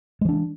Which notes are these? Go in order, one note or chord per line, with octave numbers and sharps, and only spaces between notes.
E3 G#3 D4